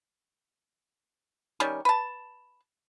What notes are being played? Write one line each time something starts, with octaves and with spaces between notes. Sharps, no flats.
D#3 G3 C#4
B4 A5